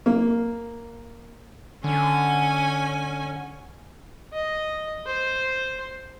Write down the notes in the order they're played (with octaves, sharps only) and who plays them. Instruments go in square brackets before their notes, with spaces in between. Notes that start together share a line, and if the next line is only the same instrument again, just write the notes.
[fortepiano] A#3
[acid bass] D3 [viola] C#4 G#5
[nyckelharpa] D#5
C5